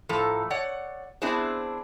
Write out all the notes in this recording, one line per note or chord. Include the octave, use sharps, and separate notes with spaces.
A2 F3 A4 A#5
C#5 D5 F#5
B3 C4 D4 E4 G#4 C5